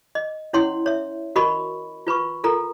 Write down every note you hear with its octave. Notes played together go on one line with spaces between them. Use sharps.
D#5
C#4 E4 C#5 F#5 C6
C#5 E5
F#4 A#4 D#5 B5 C#6
F4 B4 B5 C#6
F4 A4 A#4 A#5